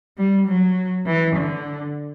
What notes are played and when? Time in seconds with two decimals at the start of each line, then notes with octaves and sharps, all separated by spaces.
0.18 G3
0.47 F#3
1.06 E3
1.36 D3